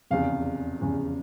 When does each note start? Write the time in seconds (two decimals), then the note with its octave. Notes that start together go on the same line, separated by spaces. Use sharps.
0.11 F1 E2 C#3 F5
0.80 F1 E2 C#3